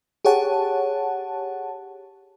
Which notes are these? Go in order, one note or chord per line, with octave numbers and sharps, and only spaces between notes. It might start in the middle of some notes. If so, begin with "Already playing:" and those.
G4 G#4 C#5 F#5 A5